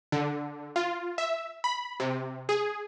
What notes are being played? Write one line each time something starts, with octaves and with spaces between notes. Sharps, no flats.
D3
F4
E5
B5
C3
G#4